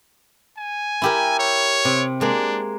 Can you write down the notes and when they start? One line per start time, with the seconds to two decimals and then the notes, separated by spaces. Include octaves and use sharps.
0.57 G#5
1.02 E4 G4 A#4
1.39 C#5
1.85 C3
2.21 G#3 A#3 D4